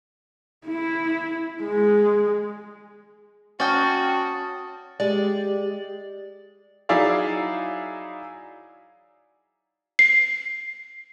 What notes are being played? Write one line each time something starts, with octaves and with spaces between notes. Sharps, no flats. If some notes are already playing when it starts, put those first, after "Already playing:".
E4
G#3
C#4 F#4 D5 F#5 G5 A5 D#6 A6
G#3 G4 D5
F#3 D#4 E4 G#4 D5 F5
C7